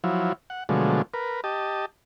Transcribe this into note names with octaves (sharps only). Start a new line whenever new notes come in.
F3 F#3 E4
F#5
B2 D3 F3 F#3 G#3 A3
A#4 B4
G4 D#5 A5